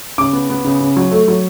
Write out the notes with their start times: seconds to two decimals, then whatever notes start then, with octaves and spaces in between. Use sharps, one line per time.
0.18 C#3 D6
0.33 B3
0.50 B3
0.64 C#3
0.80 C#3
0.96 F#3
1.11 A3
1.28 F#3